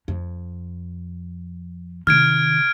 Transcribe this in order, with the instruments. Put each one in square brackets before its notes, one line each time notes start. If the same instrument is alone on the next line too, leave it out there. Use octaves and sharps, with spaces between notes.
[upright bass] F2
[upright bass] C3 D#3 [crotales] F6 G#6 D7